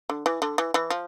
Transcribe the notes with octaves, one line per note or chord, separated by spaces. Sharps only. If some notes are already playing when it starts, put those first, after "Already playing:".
D3
E3
D3
E3
E3
F3